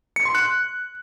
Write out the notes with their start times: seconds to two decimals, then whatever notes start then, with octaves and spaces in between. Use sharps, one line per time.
0.16 C#7
0.25 C6
0.35 F#6